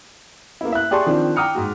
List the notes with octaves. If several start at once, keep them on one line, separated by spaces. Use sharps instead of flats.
A#3 B3 E4
E5 F#6
G4 G#4 D5 A5 C6 C#6
D#3 F3 C4 D4
G5 A#5 D6 D#6 F6 C#7
G#2 G#3 F#4